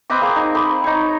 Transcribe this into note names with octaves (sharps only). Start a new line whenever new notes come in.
C4 B4 D#5 D6
A#3 G#4
D#4
C4 D#5 B5 D6
D#4 C#5